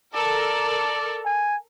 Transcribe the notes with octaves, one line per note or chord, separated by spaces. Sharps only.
A4 A#4 D5
G#5